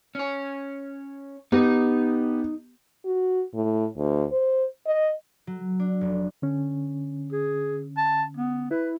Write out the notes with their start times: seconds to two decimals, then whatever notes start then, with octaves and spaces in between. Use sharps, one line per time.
0.15 C#4 C#5
1.52 B3 D#4 G4 D#5
3.05 F#4
3.54 A2
3.97 D2
4.31 C5
4.86 D#5
5.47 F#3
5.80 D4
6.01 F1
6.42 D3 C#4
7.32 G#4
7.97 A5
8.37 B3
8.71 E4 B4